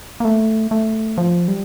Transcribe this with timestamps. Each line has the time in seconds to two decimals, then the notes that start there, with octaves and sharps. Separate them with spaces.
0.20 A#3
0.25 A3
0.71 A3
1.18 F3
1.48 G3